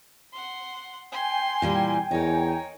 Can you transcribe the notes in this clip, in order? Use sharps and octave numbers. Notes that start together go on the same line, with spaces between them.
F#5 C6
G5 G#5 C6
A#2 E3 G3
E2 D#4 A#4 C#5